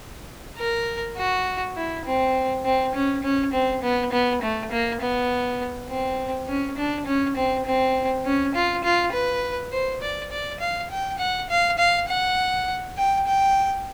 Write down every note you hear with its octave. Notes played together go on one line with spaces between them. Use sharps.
A#4
F#4
E4
C4
C4
C#4
C#4
C4
B3
B3
A3
A#3
B3
C4
C#4
D4
C#4
C4
C4
C#4
F4
F4
B4
C5
D5
D5
F5
G5
F#5
F5
F5
F#5
G5
G5